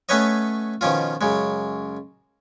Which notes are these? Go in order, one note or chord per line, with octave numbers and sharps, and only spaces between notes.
A3 B3 C#4 B4 C#5 D#5
B2 D#3 F3 C#4 F4
F#2 C#3 G#3